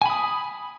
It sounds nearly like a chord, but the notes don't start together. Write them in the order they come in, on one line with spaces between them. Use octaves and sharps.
G#5 B5 D#6